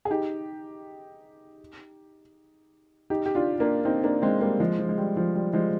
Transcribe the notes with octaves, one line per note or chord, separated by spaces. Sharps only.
G#4
D#4 G4
D#4 G4
G4
D4 F4
A#3 D4
C4 D#4
A#3 D4
G#3 C4
G3 A#3
F3 G#3
F3
G#3
G3
F3
G3
F3 G#3